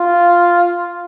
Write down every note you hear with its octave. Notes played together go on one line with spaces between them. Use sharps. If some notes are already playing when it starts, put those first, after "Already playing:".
Already playing: F4